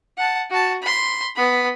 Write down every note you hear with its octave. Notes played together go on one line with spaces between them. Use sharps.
F#5 A5
F#4 A5
B5 C6
B3 B5